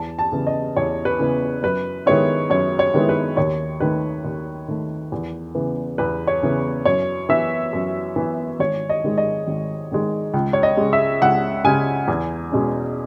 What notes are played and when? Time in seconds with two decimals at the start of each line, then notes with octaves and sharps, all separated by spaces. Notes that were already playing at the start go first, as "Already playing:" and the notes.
Already playing: E2 A5
0.19 A5
0.32 C#3 E3 B3
0.47 D#5
0.76 E2 C#5
1.05 B4
1.19 C#3 E3 B3
1.63 F#2 B4
2.06 D#3 G#3 B3 E4 C#5
2.50 F#2 C#5
2.79 C#5
2.94 D#3 G#3 B3 E4
3.09 B4
3.37 D#2 C#5
3.80 D#3 A3 B4
4.25 D#2
4.68 D#3 A3
5.12 E2
5.55 C#3 E3 B3
5.98 E2 B4
6.27 C#5
6.42 C#3 E3 B3
6.85 F#2 C#5
7.29 E3 B3 E5
7.73 F#2
8.16 E3 B3
8.59 G#1 C#5
8.89 D#5
9.04 G#2 D#3 G#3
9.18 D#5
9.47 G#1
9.91 G#2 D#3 G#3
10.34 C#2
10.53 C#5
10.63 D#5
10.77 C#3 G#3
10.93 E5
11.22 C#2 F#5
11.64 C#3 G#3 G#5
12.08 E2
12.52 B2 G#3 C#4